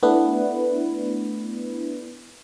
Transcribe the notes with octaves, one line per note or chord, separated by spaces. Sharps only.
A3 B3 D4 E4 B4